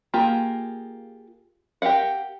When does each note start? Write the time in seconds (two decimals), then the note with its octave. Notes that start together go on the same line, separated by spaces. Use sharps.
0.14 A#3 F4 G4 G#4
1.82 G4 A#4 F5 F#5